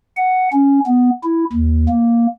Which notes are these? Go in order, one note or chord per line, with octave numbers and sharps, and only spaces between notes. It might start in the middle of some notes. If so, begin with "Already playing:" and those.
F#5
C#4
B3
E4
D#2
A#3